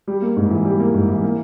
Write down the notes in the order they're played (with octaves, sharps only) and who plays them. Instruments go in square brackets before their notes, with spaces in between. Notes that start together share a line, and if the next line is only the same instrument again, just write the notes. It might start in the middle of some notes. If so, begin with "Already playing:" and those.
[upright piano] G3
A#3
G#2
E3
G3
A#3
G#2
E3
A#3